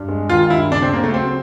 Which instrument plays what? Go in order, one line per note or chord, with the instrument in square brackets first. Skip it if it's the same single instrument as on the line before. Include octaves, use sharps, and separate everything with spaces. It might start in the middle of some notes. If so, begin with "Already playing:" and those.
Already playing: [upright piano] G2
G#3
[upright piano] D#3 [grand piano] F4
[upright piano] G2 [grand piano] E4
[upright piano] C#3 [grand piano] D4
[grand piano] C4
[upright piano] C#3 [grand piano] A#3
[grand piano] A3
[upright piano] F#3 [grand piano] C4